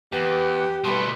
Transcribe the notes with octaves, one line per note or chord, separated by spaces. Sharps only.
E2 G4 B4
B2 G3 A3 B4 C6